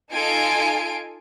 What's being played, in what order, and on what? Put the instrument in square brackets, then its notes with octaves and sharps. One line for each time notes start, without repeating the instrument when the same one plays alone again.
[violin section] D#4 F4 A4 G#5 D7